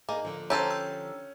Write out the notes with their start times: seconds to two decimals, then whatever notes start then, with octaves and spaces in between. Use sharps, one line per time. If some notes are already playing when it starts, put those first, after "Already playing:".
0.09 A#3 D#4 G#4 D5
0.25 D3 F3
0.50 C#4 G4 A4 C5 A#5 G6
0.71 E6